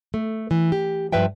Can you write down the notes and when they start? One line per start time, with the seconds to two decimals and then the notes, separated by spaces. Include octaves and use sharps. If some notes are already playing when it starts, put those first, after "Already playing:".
0.14 A3
0.51 E3
0.72 G4
1.13 G2 F3 B4 E5 G5